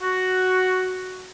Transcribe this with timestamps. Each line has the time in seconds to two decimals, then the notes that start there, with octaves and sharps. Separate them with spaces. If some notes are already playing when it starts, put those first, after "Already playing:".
0.01 F#4